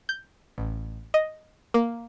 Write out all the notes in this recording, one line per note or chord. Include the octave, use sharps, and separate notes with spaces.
G6
A1
D#5
A#3